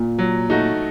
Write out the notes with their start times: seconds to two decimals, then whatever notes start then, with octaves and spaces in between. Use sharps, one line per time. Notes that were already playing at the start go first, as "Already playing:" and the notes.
Already playing: A#2
0.19 F#3
0.50 A3 D#4 F#4